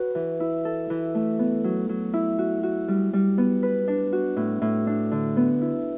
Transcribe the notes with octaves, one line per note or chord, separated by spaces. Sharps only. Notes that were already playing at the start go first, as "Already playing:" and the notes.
Already playing: F#4 B4 C#5
E3
E4
A4
E3
A3
B3
F#3
F#3
E4
F#4
F#4
G3
G3
B3
B4
D4
F#4
A2
A2
D4
D3
B3
E4